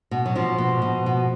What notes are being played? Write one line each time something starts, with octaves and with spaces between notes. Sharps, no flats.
B2
F#3
B2 F3
B2
B2
B2